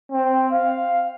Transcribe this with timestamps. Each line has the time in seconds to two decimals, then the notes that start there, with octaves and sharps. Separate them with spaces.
0.12 C4
0.53 F5